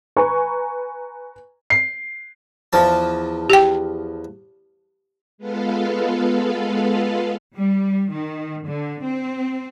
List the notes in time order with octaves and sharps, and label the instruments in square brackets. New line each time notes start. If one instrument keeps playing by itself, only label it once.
[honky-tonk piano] B4 G#5 A#5 C#6
[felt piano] C7
[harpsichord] E2 F3 A5
[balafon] G4 G5
[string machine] G#3 B3 F4 A4 B4 F5
[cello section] G3
D#3
D3
C4